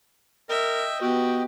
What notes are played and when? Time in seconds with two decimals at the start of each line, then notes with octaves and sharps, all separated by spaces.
0.49 A#4 D#5 E5 G5
1.01 B3 F#4 G4